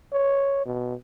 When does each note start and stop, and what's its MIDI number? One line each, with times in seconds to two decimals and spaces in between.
0.12 0.61 73
0.65 0.94 47